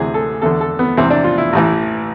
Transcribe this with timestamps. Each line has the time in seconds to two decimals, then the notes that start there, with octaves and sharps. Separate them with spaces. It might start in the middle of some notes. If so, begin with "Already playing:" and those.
Already playing: D2 C3 E3 G#4
0.14 A4
0.42 E2 D3 A4
0.61 A4
0.79 B3
0.97 E2 C3 E3 C4
1.10 D4
1.24 F4
1.38 E4
1.53 A1 A2 E3